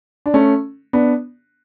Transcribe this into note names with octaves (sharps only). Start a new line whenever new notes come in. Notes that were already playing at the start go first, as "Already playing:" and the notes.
D4
A3 C#4
B3 D4